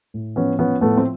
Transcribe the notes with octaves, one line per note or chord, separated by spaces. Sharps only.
A2
F3 B3 C#4
F3 B3 C#4
A2 A3 B3
C4